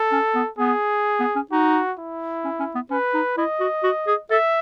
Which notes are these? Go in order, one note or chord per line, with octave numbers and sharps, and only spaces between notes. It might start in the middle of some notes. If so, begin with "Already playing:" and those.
Already playing: A4
C#4
B3
B3 G#4
B3
C#4
D#4 F#4
E4
C#4
C#4
B3
C#4 B4
D#4
E4 D#5
F#4
F#4
G#4
A4 E5